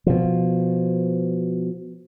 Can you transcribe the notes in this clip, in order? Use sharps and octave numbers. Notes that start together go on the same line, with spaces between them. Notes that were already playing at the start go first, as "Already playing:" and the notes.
B2 F3